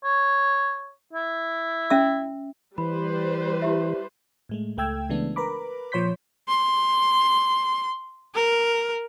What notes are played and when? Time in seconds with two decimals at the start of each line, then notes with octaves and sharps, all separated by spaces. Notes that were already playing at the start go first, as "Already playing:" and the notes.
0.04 C#5
1.13 E4
1.90 C#4 E5 E6
2.78 E3 G3 B4 C5 B5
3.62 E4 G4 E5
4.49 A2 G#3 A3
4.77 C#2 A3 G5 E6 G#6
5.09 C#3 E3 G#3 A3 B3 D4
5.36 A#4 B4 A#5 B5 D6
5.92 A#2 F3 C#5 C6 G6 B6
6.48 C6
8.35 A#4